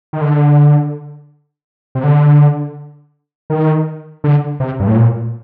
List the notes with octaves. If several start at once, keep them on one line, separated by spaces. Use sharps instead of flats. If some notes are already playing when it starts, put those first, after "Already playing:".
D#3
D3
C3
D3
D#3
D3
C3
G2
A2
A#2